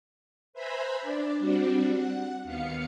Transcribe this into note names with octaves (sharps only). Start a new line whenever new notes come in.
B4 C5 E5 G#5 A#5 B5
D4 D5
G3 C4 D4 F#4
F#5
D#2 B3 F5 C#7